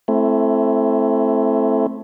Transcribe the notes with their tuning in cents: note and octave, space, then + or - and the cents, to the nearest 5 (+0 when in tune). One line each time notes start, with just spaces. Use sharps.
A3 -10 C4 +10 E4 +20